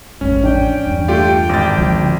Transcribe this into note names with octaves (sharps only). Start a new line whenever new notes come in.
A1 F2 G#2 C#4
D4 D5 G5
E2 G2
A3 F4 G4 G5
G#1 D6 A6
C#2 D3 F3